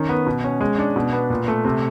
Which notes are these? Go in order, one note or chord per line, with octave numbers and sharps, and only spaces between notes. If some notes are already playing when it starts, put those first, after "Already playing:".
Already playing: D#3 C#4
B3
B2
C#4
G#3
D4
B2
B3
A#2
A3
C3